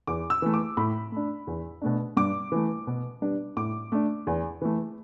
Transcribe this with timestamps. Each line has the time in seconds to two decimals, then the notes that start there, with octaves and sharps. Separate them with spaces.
0.07 E2 D6
0.30 E6
0.42 E3 A3
0.54 D6
0.77 A2 B5
1.12 A3 D4
1.47 E2
1.82 B2 A3 D4
2.17 G2 D6
2.52 E3 A3
2.87 B2
3.22 G3 B3 D4
3.57 A2 D6
3.92 A3 D4
4.27 E2
4.62 E3 A3